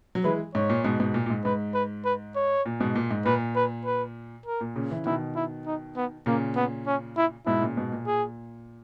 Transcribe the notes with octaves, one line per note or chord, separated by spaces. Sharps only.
F#3
E3 G#3 B4
G#2 C#5
A#2
G#2 B2
G#2 B2
A#2
A#2
G#2
G#2 B4
B4
B4
C#5
A#2
G#2 B2
A#2
G#2
A#2 B4
B4
B4
A#4
A#2
A#2 C#3
C#3 E3
B2 D#3 E4
E4
D#4
B3
A#2 C#3 A#3
B3
C#4
E4
G#2 B2 E4
A#2 C#3
G#2 B2
A#2
G#4